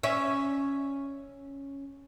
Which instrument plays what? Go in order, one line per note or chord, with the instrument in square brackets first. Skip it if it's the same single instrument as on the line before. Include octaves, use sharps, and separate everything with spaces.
[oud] C#4 E5